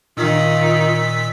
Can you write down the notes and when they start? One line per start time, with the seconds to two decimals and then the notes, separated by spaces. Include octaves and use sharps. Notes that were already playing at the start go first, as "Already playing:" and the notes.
0.17 A#2 D#3 F4 E6 B6